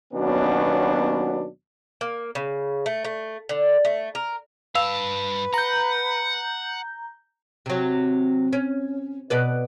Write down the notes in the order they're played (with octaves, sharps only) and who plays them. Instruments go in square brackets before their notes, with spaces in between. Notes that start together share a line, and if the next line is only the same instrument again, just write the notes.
[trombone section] D#2 B2 F#3 B3 C#4 D4
[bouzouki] A#3
C#3
A3
A3
D3
A3
A#4
[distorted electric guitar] G2 A5 [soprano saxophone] B4 [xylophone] F5 E6 F7
[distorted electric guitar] F#5 [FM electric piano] A#5 G6
[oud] C3 F#3
C#4
B2 B4 D5